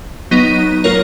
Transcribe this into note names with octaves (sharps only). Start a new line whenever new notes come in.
F#3 B3 D#4
A#3 F4 A#4 C#5